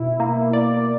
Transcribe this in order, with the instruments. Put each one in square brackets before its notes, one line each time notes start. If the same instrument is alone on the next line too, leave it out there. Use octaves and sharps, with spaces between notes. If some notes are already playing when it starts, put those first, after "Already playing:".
Already playing: [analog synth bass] B2 [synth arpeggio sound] E4
[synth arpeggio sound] A#3
D5